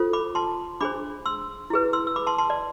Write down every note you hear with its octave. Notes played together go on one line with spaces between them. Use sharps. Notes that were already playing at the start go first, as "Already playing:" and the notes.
Already playing: F4 A4 C5
B5 D6
A5 C6
D4 G#4 C5 B5 D6
C6 E6
E4 G#4 B4
C6 E6
E6
B5 D6
A5 C6
A5 C6
D5